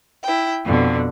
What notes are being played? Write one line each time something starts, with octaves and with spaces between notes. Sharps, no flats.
E4 G5
F2 B2 D3